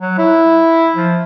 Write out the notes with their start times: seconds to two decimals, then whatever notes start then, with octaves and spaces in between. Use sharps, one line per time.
0.01 F#3
0.18 E4
0.95 F3